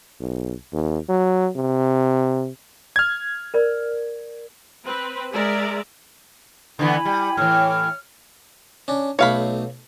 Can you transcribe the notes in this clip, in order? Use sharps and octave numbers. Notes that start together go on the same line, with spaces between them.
B1
D#2
F#3
C3
F6 G#6
A#4 D5
C4 B4
G#3 G#4 A#4 D5 E5
D3 E3 B3 E4 G#5 B5
G3
A2 E3 C#5 F6
C#4 D4
B1 A3 C#5 F5 B5